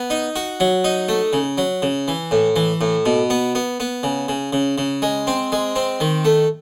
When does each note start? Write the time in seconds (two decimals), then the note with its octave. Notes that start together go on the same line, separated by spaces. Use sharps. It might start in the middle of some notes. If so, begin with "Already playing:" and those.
Already playing: B3
0.10 D#4
0.36 F#4
0.60 F#3
0.84 D#4
1.08 A3
1.33 C#3
1.58 F#3
1.82 C#3
2.08 E3
2.31 A2
2.56 E3
2.81 A2
3.06 B2
3.30 B3
3.55 B3
3.80 B3
4.03 C#3
4.28 C#3
4.53 C#3
4.78 C#3
5.02 G#3
5.27 C4
5.52 G#3
5.76 C4
6.00 D#3
6.25 A3